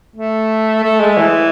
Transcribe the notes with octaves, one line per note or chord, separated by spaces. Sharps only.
A3
A3
G#3
E3